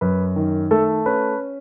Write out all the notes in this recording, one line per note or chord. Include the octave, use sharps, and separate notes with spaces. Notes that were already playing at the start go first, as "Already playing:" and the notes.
F#2 B4
D#3
A3 A4
C#4 B4